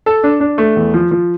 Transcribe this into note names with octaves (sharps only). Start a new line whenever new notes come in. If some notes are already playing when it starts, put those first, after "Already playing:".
A4
D4
D4
A3
E2
F3
F3